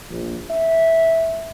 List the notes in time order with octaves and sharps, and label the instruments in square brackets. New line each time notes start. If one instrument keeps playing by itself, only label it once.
[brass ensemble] A#1
E5